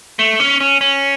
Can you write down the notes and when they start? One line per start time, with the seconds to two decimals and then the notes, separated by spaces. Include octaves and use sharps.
0.19 A3
0.40 C#4
0.60 C#4
0.81 C#4